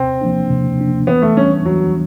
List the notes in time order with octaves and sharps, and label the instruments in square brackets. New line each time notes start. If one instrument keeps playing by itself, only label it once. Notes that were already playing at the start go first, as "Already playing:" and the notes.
Already playing: [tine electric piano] C3 [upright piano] C4
[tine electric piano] F3 A#3 D4
C3
F3 A#3 D4
[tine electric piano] E3 [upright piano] B3
[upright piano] A3
[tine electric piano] G3 B3 D4 [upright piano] C#4
[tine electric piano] E3 [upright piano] F#3